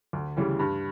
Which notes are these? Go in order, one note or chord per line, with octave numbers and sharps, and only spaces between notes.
D2
C#3 E3 G3
G2